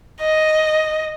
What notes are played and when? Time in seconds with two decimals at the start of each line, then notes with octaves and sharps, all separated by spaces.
0.21 D#5